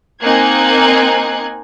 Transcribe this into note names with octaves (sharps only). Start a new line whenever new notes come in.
A#3 C4 D#4 G#5 F#6 G#6